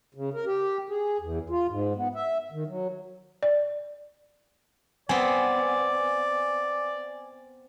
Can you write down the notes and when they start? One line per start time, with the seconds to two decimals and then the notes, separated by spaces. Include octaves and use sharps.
0.15 C#3
0.34 A#4
0.46 G4
0.89 G#4
1.20 E2
1.50 F4
1.69 G#2
1.96 B3
2.15 E5
2.52 D#3
2.67 F#3
3.43 D5
5.09 B3 C4 D5 G#5